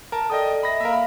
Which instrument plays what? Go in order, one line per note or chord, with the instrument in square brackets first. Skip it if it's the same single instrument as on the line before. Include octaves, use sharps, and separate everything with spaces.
[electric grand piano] A#4 A5
[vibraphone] A4 D5 [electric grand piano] D#5 G5 D#6
[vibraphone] D#5 E5 [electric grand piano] B5 A#6
[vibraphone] A#3 F5 [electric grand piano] A#4 E5
[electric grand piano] B5